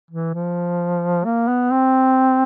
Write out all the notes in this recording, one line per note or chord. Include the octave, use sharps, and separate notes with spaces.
E3
F3
A#3
B3
C4